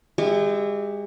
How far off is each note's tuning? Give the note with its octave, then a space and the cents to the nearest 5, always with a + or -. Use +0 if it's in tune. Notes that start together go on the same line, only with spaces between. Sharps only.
G#3 -35 G4 -20 E5 +0